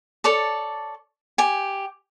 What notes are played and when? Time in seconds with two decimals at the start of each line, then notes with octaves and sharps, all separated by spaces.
0.24 A4 C#5 D5 A5
1.38 G4 G#5